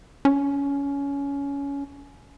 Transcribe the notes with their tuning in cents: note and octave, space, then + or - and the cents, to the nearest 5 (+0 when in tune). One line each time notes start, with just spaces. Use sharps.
C#4 +20